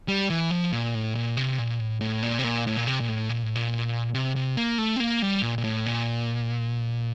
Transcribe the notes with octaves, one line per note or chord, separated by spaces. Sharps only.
G3
E3
F3
A#2
A2
A#2
C3
A#2
A2
A2
A#2
C3
A#2
A2
A#2
C3
A#2
A2
A#2
A2
A#2
C3
C3
A#3
A3
C4
A#3
G3
A#2
A#2
A2
A#2